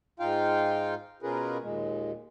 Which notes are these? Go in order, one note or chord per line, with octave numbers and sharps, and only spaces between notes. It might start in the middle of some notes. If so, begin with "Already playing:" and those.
G#2 D#4 F4 F5 G5
B2 C#4 F4 G#4 A#4 B4
D#2 A#2 G#3